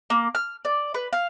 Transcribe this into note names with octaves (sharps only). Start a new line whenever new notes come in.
A#3
F6
D5
B4
F5